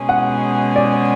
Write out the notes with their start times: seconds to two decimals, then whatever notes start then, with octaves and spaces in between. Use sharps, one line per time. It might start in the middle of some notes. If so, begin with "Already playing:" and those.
Already playing: B2 G#3 C#4 G#4
0.09 F#5
0.76 D5